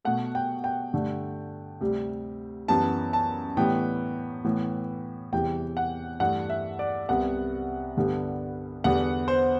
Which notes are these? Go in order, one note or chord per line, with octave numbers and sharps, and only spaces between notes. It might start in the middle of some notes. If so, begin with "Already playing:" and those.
B2 A3 F#5
G5
G5
G2 D3 A3
D2 C3 G3
F#2 E3 G3 B3 A5
A5
A2 E3 G3 B3 G5
A2 E3 B3
E2 C3 E3 G3 G5
F#5
G2 E3 A3 F#5
E5
D5
C2 C3 G3 B3 F#5
G2 D3 G3 B3
E2 D3 G3 B3 F#5
C5